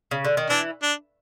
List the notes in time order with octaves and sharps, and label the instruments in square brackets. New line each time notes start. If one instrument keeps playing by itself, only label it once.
[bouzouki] C#3
D3
D#3
[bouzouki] E3 [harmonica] D4
[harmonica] D4